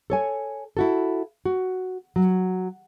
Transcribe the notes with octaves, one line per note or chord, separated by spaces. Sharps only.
A4 C#5 G#5
E4 F#4 A4
F#4
F#3